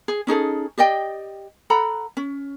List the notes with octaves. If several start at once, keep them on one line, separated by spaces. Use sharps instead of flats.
G#4
C#4 D#4 G#4 A4
G4 D5 D#5 G5
A4 F#5 A#5 B5
C#4